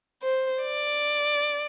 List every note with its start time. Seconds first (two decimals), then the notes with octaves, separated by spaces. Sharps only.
0.22 C5
0.63 D5